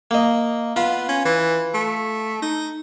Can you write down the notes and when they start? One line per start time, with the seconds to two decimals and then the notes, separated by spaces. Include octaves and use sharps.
0.11 A#3 D#5
0.76 B3 F4
1.09 C#4
1.25 E3
1.74 A3
2.42 D#4